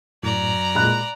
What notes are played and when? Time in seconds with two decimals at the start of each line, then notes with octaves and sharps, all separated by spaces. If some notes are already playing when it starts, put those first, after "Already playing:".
0.23 F#2 A2 D5 A#5
0.75 A#2 G#3 B5 F#6